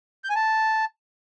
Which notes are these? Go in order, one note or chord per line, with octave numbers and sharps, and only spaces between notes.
G6
G#5
A5